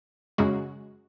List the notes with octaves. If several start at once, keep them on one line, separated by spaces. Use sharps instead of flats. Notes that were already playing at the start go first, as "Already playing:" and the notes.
F#2 C#3 G#3 F#4